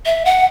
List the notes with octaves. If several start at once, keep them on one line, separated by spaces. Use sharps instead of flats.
E5
F#5